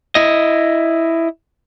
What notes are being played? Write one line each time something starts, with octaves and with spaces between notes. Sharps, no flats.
E4 D#5